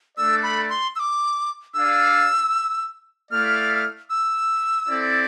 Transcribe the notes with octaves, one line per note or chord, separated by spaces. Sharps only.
A3 D4 A4 D5 E6
B5
C6
E6
D6
D4 G#4 D5 F5 E6
A3 E4 A4 D5 F5 F6
E6
C4 E4 A4 D5